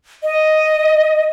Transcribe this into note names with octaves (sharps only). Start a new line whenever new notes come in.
D#5